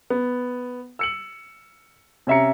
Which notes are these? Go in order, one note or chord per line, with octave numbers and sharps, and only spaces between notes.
B3
E6 C#7 F#7
C3 C#4 E5 A#5 C#7